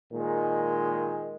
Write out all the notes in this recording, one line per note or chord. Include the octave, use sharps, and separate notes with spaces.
A#2 D#3 G#3